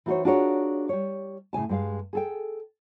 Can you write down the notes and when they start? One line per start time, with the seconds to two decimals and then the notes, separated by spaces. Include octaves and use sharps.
0.06 E3 D#4 F#4 A4 C5 C#5
0.25 D4 F4 F#4 G#4 A#4 C#5
0.89 G3 C#5
1.53 A2 C#3 G#5 A5
1.69 G2 G#3 F5
2.13 G#4 A4 G5